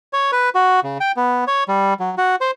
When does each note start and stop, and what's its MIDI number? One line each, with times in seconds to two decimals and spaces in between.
0.13 0.31 73
0.32 0.49 71
0.55 0.80 66
0.83 0.98 49
1.00 1.12 79
1.17 1.44 59
1.47 1.64 73
1.68 1.94 55
2.00 2.15 54
2.18 2.36 66
2.41 2.51 72